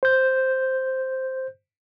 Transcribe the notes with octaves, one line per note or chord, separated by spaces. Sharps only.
C5 G6